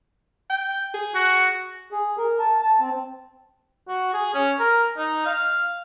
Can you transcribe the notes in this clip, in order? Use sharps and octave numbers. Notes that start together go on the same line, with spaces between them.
G5
G#4
F#4
G#4
A#4
A5
A5
C4
F#4
G#4
C#4
A#4
D#4
F5